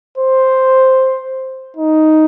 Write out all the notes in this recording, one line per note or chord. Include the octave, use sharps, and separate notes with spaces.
C5
D#4